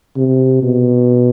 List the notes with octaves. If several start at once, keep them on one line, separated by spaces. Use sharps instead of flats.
C3
B2